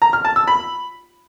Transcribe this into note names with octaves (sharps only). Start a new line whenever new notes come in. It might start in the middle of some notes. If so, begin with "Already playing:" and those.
A#5
F6
A5
E6
B5